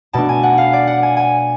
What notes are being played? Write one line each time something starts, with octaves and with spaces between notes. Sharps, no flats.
B2 A3 D4 A5
G#5
F#5
F5
D5
F#5
G#5
G#5